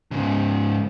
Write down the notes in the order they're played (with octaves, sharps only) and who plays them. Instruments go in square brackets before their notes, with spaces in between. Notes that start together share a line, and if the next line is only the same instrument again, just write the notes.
[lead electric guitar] G#2 C#3